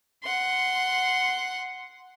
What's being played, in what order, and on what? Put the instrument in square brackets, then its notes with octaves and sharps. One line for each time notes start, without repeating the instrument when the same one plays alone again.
[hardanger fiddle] F#5 C6